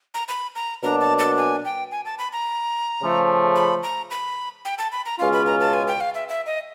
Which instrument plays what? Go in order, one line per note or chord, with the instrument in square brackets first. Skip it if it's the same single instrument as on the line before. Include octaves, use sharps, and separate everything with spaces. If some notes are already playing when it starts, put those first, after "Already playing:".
[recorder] A#5
B5
A#5
[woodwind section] B2 F#3 A#3 D4 [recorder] A#5
[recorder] A5
A5
G#5
G5
G#5
A5
B5
A#5
[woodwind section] C#3 F3 A3
[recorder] B5
A#5
B5
G5
A5
B5
A#5
[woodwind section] C#2 B2 G#3 C#4 F4 [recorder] F5
[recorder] B5
A#5
A5
G#5
G5
F5
E5
E5
D#5